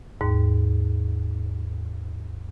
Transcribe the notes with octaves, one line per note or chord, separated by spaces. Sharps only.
D#2 G#2